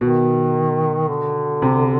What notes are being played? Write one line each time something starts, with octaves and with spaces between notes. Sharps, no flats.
B2 D#3
D3
C3